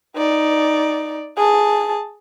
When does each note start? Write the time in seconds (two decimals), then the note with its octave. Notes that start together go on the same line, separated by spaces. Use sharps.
0.16 D#4 D5
1.37 G#4 A5